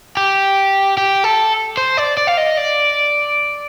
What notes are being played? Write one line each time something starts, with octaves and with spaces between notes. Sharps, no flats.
G4
G4
A4
C5
D5
D5
F5
D#5
D5